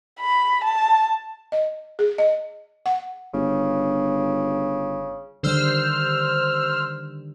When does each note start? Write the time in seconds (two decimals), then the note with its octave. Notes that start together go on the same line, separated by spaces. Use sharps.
0.20 B5
0.64 A5
1.52 D#5
1.99 G#4
2.18 D#5
2.86 F#5
3.34 G1 C#3
5.43 D3 D#3 G3 C5 E6 F6